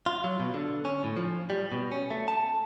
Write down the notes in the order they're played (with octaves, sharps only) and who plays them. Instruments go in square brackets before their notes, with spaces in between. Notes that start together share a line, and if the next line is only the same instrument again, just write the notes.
[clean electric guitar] F4
F#3
B2
D3
C#4
A2
F3
G3
B2
C#4
A3
A5